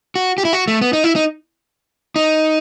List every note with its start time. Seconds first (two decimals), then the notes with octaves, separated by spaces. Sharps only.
0.16 F#4
0.38 G4
0.45 E4
0.53 F#4
0.68 A3
0.81 B3
0.93 D#4
1.04 E4
1.16 D#4
2.16 D#4